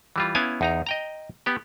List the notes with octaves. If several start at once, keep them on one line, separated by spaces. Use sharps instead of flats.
E3 G3 F4
B3 C#4 E4 F5 G#5
E2 D#4 A#5
D#5 G5 A#5
B3 G4